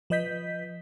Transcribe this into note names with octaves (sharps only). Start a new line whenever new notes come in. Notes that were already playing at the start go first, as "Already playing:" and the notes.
F3 B4 D#5 G6 B6